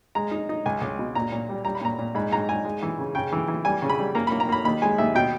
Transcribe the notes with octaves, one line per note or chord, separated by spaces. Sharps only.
G#3 A#5
D#4
D#4
C#2 G#5
C#2
B2
A#2 A#5
A#2
G3
G3 A#5
B5
A#2 A#5
A#2
G#2 B5
G#2 A#5
G#2 G#5
G#3
E3
C#3
C#3 G5
E3
E3
G3 G#5
C#3
B5
G3
A#3 A#5
A#3 B5
A#5
A#3 B5
D#2 B5
G#3 G#5
D#2 E5
B2 G5